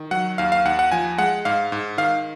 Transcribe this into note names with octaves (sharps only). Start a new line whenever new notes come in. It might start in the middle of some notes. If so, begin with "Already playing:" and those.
Already playing: D#3
F#3 F#5
D#2 F5
F5
D#2 F#5
F#5
F3 G#5
G#3 F#5
G#2 F5
G#2
D#3 F5